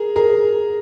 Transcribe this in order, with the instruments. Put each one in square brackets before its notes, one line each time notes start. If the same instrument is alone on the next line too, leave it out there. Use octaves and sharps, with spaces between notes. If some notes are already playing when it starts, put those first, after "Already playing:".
Already playing: [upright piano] G#4 A#4
G#4 A#4